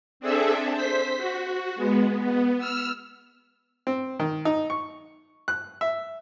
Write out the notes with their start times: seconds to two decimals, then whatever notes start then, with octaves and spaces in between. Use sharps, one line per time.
0.20 C4 D4 G#4 A4 E5
0.72 C5 B6
1.17 F#4
1.76 G#3 B3
2.19 B3
2.58 E6 F6
3.87 C4
4.20 D#3
4.45 D#4
4.70 C#6
5.48 F#6
5.81 E5